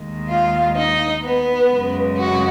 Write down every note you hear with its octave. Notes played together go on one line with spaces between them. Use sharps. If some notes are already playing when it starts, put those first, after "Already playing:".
Already playing: D#2 D#3 G#3
F4 F5
D#4 D#5
B3 B4
F#2 C#3 G#3
F#4 F#5